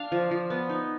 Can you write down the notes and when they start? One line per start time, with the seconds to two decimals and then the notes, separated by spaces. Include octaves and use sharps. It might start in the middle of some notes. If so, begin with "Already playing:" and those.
Already playing: D4 F5
0.12 F3
0.31 F3
0.50 B3
0.69 D#4